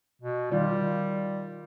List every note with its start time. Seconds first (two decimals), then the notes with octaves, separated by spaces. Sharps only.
0.22 B2
0.52 D#3 G3 F4 D5